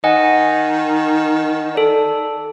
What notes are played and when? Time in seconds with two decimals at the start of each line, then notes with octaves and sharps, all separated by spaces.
0.04 D#3 D#5 F#5 G#5
1.75 A4 D5